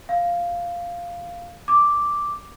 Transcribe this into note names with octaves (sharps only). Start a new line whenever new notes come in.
F5
D6